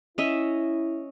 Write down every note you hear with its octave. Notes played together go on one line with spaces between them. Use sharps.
C#4 E4 D#5 E5